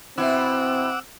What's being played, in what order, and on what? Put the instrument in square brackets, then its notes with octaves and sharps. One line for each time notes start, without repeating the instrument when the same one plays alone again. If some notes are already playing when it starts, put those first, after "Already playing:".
[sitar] B2 E4 [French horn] C4 [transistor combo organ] F#5 D6 E6